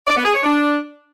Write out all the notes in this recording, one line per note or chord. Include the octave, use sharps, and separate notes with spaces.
D5
B3
G#4
C#5
D4